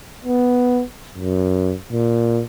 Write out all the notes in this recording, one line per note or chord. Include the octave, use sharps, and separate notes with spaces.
B3
F#2
A#2